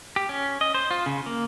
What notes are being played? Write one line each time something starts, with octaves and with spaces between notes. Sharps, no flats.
G4
C#4
D#5
C5
F4
C#3
A#3